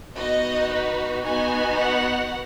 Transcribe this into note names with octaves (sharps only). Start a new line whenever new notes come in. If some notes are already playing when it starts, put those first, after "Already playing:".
B3 D#4 F#4 D#5
B4
B3 D#4 F#4 G#5
F#5